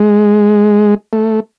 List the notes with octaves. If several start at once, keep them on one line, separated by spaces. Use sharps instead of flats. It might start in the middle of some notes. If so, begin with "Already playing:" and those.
Already playing: G#3
A3